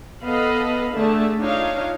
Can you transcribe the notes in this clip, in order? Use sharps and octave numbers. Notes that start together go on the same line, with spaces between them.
B3 A4 B4 D#5 F5 B5
D3 A3 G#4 E5 A5
D4 D#4 F4 C#5 F5